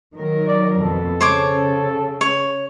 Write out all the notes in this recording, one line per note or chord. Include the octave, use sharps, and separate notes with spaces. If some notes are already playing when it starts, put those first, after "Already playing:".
D#3 F#3 A#4
D5
F2 B2 A4
C#3 C5 C#5 D6
C#5